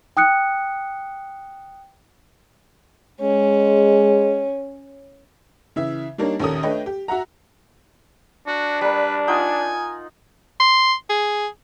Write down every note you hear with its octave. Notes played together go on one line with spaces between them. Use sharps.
G5 D#6 F#6 C#7
G#3 C#4
C#3 E3 E5
G3 A#3 D4 D#4 A#4 C#5
A#1 D#2 C#4 A4 A#4 D#6
A3 D4 B4 C#5 D#5 G5
G4
F#4 E5 F#5 A#5
D4 F#4
G3 A#4 B4
D#4 F4 F#5 G#5
C6
G#4